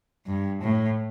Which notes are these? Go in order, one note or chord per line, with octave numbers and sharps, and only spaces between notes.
G2
A2